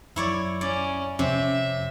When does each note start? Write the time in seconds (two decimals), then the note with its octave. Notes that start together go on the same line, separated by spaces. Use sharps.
0.16 F#2 E4 C#5 D5
0.61 C#4 D5
1.19 F2 C3 C#4 C#5 E5